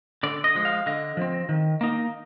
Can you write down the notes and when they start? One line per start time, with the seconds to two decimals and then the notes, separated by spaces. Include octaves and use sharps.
0.23 D3 D5
0.44 D#5
0.55 F3 G#3
0.65 F5
0.86 D3 D#5
1.17 F3 C4
1.49 D#3
1.81 A#3 D#4